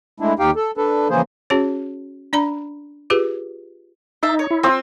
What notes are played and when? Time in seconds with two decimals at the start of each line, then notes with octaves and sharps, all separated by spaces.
0.20 G#3 A3 D4 E4
0.39 D#2 D#4 G4 F5 G5
0.56 A4
0.77 D4 A4 B4
1.10 C#3 E3 F3 A#3 G#4 C5
1.50 C#4 F#4 G#4 C#5
2.33 D4 D5 A#5 B5
3.10 F4 G4 G#4 B4
4.23 D#4 C5 E5 A5
4.39 C#5
4.51 E4
4.63 C4 F4 E6